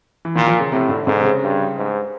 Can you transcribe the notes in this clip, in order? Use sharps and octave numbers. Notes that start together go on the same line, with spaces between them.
E3
A#2 D#3
F3
C#3
A2 C3
D3
G#2 D3
C3
C#3
G2
G#2